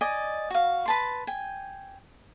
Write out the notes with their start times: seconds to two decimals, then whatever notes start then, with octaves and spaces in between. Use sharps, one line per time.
0.01 D5 D#5 G#5
0.50 F#4 F5
0.86 B4 A5 C6
1.27 G5 G#5